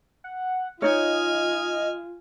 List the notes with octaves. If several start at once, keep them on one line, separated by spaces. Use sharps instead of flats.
F#5
D#4 F4 C#5 D#5 G#5 F6